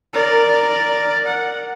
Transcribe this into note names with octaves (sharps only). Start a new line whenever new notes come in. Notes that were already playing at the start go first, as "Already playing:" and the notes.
A#4 D5
F#5